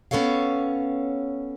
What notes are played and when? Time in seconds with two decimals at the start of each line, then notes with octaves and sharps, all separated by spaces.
0.11 B3 C#4 A4 C#5 F5